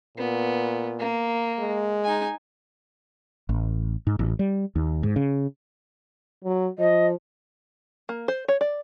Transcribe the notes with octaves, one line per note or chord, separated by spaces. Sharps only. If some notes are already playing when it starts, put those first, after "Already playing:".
A#2 B3
A#3
G#3
D#4 G#5
A1
G#2
A1
G3
D#2
G#2
C#3
F#3
F3 D#5
A#3
C5
C#5
D5